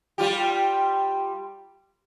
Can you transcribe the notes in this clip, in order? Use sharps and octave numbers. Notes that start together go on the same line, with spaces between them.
G3 F4 G4